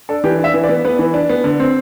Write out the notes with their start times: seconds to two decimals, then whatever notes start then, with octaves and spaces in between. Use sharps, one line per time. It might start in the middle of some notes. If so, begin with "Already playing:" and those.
0.09 D4 A4
0.24 E3 G4
0.39 D4
0.44 E5
0.54 E3
0.64 D5
0.69 B3
0.85 B3 B4
0.99 E3
1.14 D4
1.29 B3
1.44 D3
1.60 C4